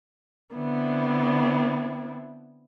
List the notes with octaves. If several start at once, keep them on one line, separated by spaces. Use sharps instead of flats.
D3 B3 C4 E4